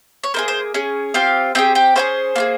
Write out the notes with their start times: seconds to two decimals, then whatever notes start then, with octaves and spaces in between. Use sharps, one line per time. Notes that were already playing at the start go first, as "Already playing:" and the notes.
0.23 C#5
0.34 A#3 D#4 G#4 C5
0.48 C5
0.74 C#4 G#4
1.14 C4 F4 G4 F5
1.55 C4 F4 G4 G#4 G5
1.75 G4 G5
1.96 C#4 F4 G#4 C5
2.36 A#3 F4 G#4